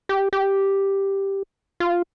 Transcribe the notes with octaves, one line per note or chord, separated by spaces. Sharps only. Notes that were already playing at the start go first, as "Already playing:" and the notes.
G4
G4
F4